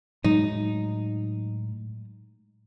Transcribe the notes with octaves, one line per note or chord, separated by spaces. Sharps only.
A2 F#3 G#3 D#4